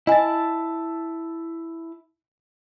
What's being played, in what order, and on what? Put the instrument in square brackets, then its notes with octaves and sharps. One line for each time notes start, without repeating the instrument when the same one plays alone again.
[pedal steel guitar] E4 A5 [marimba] D#5 G#5